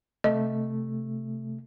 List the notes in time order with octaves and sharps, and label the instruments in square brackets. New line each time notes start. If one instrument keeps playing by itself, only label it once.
[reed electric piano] C3 A3 [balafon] D#5